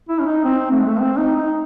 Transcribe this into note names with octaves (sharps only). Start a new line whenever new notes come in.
E4
C#4
D#4
C4
A3
G#3
A3
C4
D#4
D#4